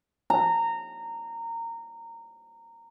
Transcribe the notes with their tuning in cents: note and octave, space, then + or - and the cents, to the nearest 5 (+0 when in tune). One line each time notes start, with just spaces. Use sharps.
A#5 -20